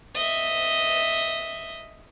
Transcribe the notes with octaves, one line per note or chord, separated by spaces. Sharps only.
D#5 E5